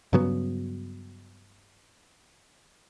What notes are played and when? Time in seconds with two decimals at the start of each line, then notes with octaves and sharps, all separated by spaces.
0.13 G2 C#3 F#3 B3